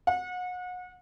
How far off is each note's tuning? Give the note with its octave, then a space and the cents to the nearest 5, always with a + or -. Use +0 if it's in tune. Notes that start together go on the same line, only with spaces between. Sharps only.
F#5 -30